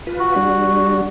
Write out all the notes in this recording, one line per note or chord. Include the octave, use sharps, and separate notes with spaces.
F4 B4
F#4
G3 D4